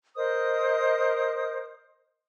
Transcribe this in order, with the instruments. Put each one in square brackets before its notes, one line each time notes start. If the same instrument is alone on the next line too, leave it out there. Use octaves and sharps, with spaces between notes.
[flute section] A#4 C5 D#5 D#6